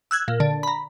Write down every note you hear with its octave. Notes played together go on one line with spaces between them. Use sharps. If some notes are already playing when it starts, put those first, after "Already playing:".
E6 F#6 G#6
A#2
D3
A#5 B5